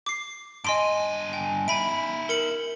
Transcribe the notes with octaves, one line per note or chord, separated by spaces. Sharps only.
D6 C7
G2 D#5 G#5 C6 D7
G5
D#4 E5 G#5 B5 D7
A#4 C#7 F#7